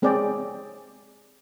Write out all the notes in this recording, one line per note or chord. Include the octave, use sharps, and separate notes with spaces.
G#3 C4 G#4 C#5 D5 G5